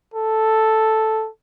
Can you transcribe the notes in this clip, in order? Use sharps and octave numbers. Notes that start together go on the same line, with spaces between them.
A4